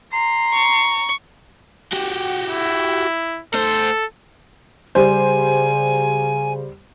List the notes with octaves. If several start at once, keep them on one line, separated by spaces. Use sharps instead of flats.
A#5 C6
C#6
F#4 G4
E4
A3 A4 C5
C#3 G3 C5 G#5